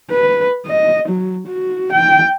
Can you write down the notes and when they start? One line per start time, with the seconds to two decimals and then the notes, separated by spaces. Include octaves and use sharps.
0.10 B4
0.66 D#5
1.08 F#3
1.47 F#4
1.92 G5